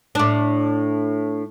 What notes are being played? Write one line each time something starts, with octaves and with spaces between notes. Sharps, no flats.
A2 D4